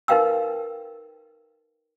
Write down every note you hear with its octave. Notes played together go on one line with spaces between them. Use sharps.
D#4 A#4 B4 F5 G5 E6